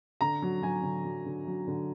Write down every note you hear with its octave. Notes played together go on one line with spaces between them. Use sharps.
D3 A#5
F#3
F#3 G#5
D3
F#3
D3
F#3
D3